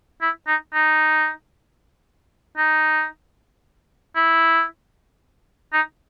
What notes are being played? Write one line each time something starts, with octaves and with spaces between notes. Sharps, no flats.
E4
D#4
D#4
D#4
E4
D#4